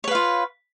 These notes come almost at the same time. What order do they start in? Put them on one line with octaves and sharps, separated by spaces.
C#5 B4 F5 F4